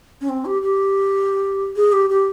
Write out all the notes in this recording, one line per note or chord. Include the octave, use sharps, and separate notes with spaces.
C#4
C4
G4
G4
G#4
G4
G4